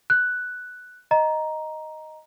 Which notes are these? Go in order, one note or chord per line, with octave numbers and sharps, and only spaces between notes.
F#6
D#5 A#5